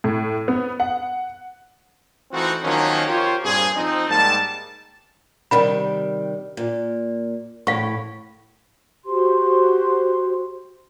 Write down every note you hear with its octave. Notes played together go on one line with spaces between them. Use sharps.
A2
B3
F#5
E3 A3 C4 D#4 F4 F#4
D#3 F3 F#3 A#3 C4 C#4
F4 G4 A#4 C5 C#5
G2 A#2 C4 G#4
F3 C4 D#4
G#2 G3 A#3 A5
C3 D#3 G3 B5
A#2
A2 F5 C#6
F#4 G4 C5 C6